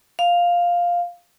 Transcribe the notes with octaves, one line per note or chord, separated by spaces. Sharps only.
F5